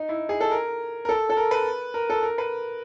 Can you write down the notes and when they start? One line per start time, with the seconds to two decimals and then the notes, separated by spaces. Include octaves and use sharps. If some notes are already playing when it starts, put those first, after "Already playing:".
Already playing: D#4
0.09 E4
0.29 G#4
0.41 A4
0.51 A#4
1.05 A#4
1.09 A4
1.30 A4
1.37 A#4
1.51 B4
1.94 A#4
2.10 A4
2.23 A#4
2.38 B4